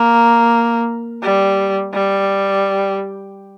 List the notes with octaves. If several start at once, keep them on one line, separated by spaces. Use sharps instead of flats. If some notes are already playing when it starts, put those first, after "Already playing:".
Already playing: A#3
G3
G3